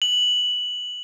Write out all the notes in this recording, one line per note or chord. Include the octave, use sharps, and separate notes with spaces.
F#7